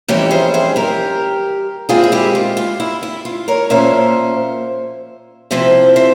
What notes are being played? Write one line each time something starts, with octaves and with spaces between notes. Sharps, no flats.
F2 E3 G3 C#4 E4 G4 A#4
G#4 C5
G#4 C5
G4 A#4
A#2 G#3 C4 E4 F4 G#4
G#4
E4 G4
F4
F4
E4
E4
F4
A#4 C#5
A#2 F3 A#3 C#4 C5 E5
C3 F3 C4 E4 C5 E5
C5 E5